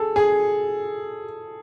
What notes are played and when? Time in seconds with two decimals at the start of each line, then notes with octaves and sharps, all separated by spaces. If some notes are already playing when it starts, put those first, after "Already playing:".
Already playing: G#4 A4
0.16 G#4